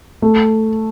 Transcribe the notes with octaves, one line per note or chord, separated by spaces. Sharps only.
A3